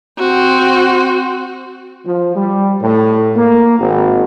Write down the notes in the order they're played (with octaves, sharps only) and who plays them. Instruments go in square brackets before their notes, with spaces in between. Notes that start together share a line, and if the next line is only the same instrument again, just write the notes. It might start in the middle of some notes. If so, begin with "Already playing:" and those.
[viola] C4 F#4
[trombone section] F3
G3
A2
A#3
G#1